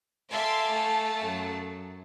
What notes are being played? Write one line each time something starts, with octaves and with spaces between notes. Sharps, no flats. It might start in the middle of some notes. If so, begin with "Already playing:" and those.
A4 E5 F5 G#5 C6 D6
A3 A5
F#2